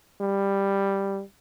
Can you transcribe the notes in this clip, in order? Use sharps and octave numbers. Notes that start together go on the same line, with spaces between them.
G3